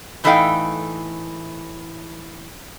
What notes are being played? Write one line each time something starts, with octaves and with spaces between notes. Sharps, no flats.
A2 E3 A3 D#4 F5 G5